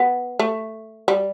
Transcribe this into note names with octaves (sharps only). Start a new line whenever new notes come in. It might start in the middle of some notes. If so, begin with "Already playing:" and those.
Already playing: B3
A3
G3